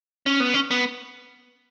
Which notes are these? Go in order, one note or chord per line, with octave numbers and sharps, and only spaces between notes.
C#4
B3
C#4
B3